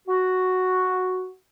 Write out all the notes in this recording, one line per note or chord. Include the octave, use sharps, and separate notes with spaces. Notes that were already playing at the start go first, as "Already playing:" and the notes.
F#4